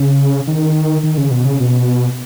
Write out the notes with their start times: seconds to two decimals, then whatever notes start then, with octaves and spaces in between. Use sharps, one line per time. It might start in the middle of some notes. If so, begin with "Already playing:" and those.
Already playing: C#3
0.47 D#3
1.03 D#3
1.18 C#3
1.31 B2
1.45 C#3
1.60 B2